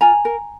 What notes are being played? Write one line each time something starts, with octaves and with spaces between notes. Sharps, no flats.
F4 G#5 A#5
A#4